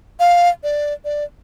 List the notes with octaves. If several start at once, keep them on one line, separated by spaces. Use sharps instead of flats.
F5
D5
D5